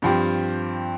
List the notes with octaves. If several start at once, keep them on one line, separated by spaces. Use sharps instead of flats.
G2 F3 C4 G4